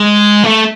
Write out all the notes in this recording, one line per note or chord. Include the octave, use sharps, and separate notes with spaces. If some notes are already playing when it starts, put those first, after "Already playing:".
Already playing: G#3
A3